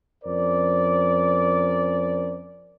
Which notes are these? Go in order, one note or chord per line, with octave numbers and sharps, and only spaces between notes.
F2 C#4 A#4 C5 D5